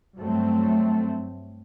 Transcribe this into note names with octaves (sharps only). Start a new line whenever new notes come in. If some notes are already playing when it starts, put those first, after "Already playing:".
G2 F#3 A3 C4